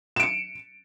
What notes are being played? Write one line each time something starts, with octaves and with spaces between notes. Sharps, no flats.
C#7 D7 E7